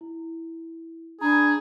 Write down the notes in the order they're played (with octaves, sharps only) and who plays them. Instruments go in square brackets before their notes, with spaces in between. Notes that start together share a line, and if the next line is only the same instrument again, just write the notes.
[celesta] E4
[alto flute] D4 [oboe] G#4 [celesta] A#5 B5